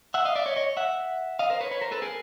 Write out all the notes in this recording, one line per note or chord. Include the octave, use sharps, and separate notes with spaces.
E5 F#5
D#5 F5
D5 E5
C#5 D#5
C#5 D#5
E5 F#5
D#5 F5
A#4 C5
B4 C#5
B4 C#5
A#4 C5
A4 B4
G#4 A#4